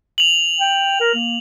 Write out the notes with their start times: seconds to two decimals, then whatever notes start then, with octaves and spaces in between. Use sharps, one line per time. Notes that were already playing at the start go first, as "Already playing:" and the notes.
0.18 F7 F#7
0.60 G5
1.00 A#4
1.14 A#3